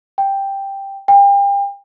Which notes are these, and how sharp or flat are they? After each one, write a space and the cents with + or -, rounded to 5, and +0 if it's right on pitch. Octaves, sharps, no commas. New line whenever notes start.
G5 +5
G5 +35